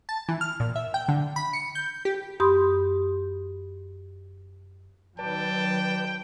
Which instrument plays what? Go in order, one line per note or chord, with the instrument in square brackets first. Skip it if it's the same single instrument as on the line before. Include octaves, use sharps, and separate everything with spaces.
[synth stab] A5
E3
F6
A#2
E5
G5
D3
B5
C#7
G6
G4
[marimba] F#2 G4 B5 C6 D#6
[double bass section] D#3 F#3 [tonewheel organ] B4 D5 [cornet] G5 [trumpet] A5